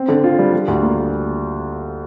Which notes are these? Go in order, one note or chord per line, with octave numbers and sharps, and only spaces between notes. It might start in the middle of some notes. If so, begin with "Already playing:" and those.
Already playing: C4
D3
F4
G3
G3
D2
A#3